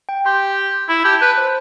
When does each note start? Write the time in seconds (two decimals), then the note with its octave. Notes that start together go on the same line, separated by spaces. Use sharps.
0.09 G5
0.26 G4 C6
0.89 E4 B5
1.00 B5
1.05 G4 A5
1.21 B4 A5
1.38 C5